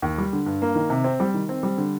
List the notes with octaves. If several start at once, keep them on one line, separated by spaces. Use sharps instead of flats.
D#2
G3
D3
G2
A#3
D#3
C3
C4
G3
D#3
C4
G3
D3